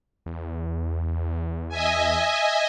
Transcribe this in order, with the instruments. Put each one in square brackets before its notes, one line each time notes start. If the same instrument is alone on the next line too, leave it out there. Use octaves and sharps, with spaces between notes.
[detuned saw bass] E2
[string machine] D#5 E5 G#5